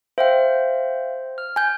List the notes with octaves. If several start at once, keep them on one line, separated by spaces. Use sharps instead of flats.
C5 E5 F5 G5
F6
G#5 G6